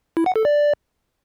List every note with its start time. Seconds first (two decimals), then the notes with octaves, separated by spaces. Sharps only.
0.17 E4
0.26 F#5
0.36 A4
0.45 D5